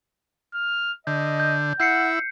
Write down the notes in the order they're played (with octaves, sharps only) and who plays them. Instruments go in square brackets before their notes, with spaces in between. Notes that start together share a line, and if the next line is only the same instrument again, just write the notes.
[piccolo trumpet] F6
[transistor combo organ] D3 [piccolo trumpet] D#5 [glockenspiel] G6
[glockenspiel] G6
[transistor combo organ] E4 [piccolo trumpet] F#5 [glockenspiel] G6 C7 C#7